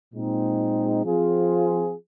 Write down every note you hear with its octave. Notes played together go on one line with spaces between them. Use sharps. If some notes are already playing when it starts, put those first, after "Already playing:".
A#2 G#3 C4 D#4
F3 C4 F4 G#4